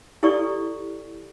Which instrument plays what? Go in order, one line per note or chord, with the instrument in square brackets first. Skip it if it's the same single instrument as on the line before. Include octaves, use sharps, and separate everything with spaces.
[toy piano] E4 G4 A4 D5 C#6